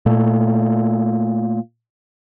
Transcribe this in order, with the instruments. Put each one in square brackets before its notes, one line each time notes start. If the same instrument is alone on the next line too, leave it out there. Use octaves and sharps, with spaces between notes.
[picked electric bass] A#2 A3